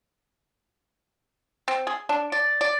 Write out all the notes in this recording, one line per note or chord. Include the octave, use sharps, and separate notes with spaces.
C4
G#4
D4
D5
D5